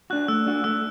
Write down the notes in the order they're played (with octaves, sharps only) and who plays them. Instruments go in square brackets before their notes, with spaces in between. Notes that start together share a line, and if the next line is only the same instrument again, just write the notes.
[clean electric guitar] D4 F#4 [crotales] F#6
[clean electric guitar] A3 [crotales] E6
[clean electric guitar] D4 F#4
[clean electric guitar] A3 [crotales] E6